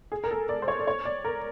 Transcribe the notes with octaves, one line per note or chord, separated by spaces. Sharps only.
G#4
A#4
A4
D5
C5
C#5
D5
C#5
D5
A#4